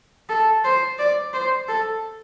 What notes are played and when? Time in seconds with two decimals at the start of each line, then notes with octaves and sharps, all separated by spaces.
0.29 A4
0.64 C5
0.99 D5
1.33 C5
1.68 A4